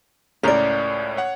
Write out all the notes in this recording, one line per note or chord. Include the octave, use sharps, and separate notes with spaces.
C#2 A2 C#4 A#4 D5
C#5 F#5